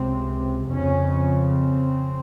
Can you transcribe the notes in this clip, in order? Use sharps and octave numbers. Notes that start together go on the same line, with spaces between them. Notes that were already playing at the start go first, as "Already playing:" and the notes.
Already playing: C#2 C3 C4
F2 C#3 C#4
C4